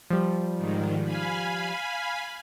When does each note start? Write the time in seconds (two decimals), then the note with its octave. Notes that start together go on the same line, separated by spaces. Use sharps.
0.10 F3 G3
0.55 G#2 D#3
1.05 F5 G#5 B5